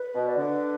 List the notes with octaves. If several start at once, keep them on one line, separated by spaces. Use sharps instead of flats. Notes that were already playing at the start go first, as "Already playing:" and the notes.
Already playing: B4
B2
D5
D3 B4